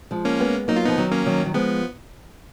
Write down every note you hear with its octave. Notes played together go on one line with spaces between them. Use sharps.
F3 G#3
A#3 C#4
G#3 B3
F#3 A#3 D#4
F4
F3 B3 D#4
D#3 F#3
A#3 C#4
D#3 F#3
F#3
F3 G#3 B3